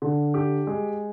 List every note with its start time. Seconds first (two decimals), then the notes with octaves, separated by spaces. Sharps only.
0.02 D3
0.34 G4
0.67 G#3